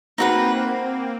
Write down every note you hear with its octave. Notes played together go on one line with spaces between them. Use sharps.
A#3 C4 D#4 F#4 B4